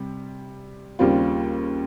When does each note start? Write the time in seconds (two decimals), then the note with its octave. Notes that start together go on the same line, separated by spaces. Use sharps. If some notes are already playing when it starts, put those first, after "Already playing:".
Already playing: C3 G3
0.99 D#2 C#3 G3 C4 F4